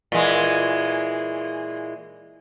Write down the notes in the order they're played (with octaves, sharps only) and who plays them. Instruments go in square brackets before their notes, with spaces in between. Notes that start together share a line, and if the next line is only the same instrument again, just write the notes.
[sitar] A#2 E3 G#3